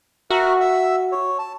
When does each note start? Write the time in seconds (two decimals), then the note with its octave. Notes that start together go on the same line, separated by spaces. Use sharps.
0.30 F#4 A#4 E5 F6
0.60 E5 E6
1.12 C#5
1.39 A5